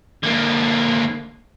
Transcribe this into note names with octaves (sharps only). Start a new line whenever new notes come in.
D3 A#3